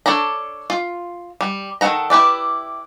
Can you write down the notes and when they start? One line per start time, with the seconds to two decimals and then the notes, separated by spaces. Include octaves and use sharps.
0.06 D4 A4 C#5 D5 A#5
0.70 F4
1.41 G3
1.81 D#3 E3 A4 F#5 A#5
2.10 E4 G4 B4 D5